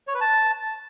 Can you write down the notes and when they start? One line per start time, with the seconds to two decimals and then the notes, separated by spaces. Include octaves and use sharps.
0.07 C#5
0.14 B4
0.21 A5